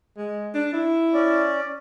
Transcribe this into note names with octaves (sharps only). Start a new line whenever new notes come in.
G#3
D4
E4
C#4 D5